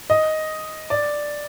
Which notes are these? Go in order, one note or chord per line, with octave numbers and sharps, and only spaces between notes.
D#5
D5